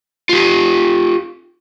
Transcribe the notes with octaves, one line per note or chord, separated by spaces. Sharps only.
F4 G4